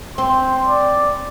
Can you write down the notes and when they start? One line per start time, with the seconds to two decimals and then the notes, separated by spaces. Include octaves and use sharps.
0.18 C4 C6
0.66 D5